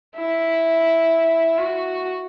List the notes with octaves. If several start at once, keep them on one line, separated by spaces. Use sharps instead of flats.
E4
F#4